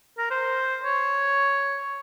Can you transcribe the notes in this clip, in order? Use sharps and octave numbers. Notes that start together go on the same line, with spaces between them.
A#4
C5
C#5